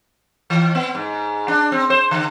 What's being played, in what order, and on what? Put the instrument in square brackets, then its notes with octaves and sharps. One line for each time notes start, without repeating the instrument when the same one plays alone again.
[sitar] E3
B3
G#2
D4
C4
C5
D3